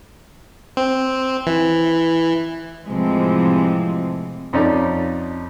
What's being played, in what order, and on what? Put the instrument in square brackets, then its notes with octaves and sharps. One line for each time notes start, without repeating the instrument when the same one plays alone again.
[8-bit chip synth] C4
E3
[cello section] A2 C3 E3 F3 G#3 C4
[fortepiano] F2 C#4 D#4 D5